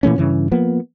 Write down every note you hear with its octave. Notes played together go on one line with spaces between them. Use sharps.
A#2 E3 A3 C#4
G2 C#3 E3
F3 A#3 B3